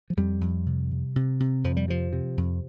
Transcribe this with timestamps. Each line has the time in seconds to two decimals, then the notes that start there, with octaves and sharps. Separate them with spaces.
0.10 F3
0.17 F2 G3
0.41 F2
0.66 C3
0.91 C3
1.16 C3
1.40 C3
1.64 F2 F3
1.77 G3
1.88 C3 F3
2.13 C3
2.37 F2